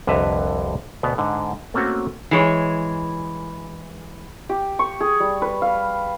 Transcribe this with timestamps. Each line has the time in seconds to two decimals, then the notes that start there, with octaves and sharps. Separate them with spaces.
0.07 C2 F2 D3 B4 E5 A#5
1.03 D2 B2 B3
1.18 G#2 D3
1.74 A3 A#3 C4 C#4 F#4
2.31 E3 G#3 C#5
4.49 G4
4.79 C#6
5.00 G#4
5.20 G3
5.42 B4
5.62 F5